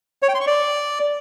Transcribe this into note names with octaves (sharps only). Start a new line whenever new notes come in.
C#5
G5
C6
C#6
D5